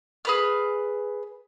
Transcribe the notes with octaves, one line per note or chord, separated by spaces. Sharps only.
G#4 B4 F6